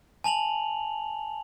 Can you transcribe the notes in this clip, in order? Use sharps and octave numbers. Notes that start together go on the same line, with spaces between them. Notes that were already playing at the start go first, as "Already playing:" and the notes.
G#5 A5 F7 F#7